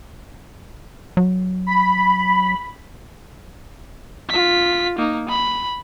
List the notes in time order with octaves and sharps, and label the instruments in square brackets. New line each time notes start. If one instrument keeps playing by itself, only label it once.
[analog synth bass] F#3
[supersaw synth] B5
[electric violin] F4 B6
A#3 D#4
B5